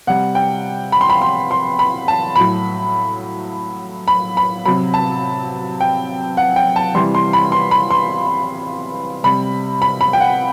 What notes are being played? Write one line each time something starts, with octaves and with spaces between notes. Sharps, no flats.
C3 G3 F#5
G5
B5
C6
B5
C6
C6
B5
A5
A2 F#3 B5
B5
B5
C3 F#3 B5
A5
G5
F#5
G5
A5
C3 E3 G3 C6
C6
B5
C6
B5
C6
C3 G3 B5
B5
B5
G5
F#5